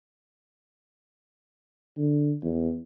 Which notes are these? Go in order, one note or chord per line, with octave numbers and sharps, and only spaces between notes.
D3
E2